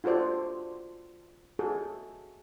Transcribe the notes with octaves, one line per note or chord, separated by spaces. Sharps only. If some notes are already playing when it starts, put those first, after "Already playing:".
F4 F#4 A4 C5 D5
F#4 G#4 A4